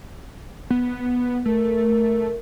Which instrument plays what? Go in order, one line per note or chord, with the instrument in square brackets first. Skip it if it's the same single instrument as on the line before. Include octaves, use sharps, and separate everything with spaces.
[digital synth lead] B3
[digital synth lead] A3 [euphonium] A#4